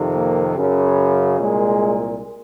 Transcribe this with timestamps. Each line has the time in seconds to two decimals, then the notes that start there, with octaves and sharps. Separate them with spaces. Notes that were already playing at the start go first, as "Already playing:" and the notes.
Already playing: F2 C3 D#3
0.13 A#3
0.56 F#2 C#3
1.39 C2 A#2 G#3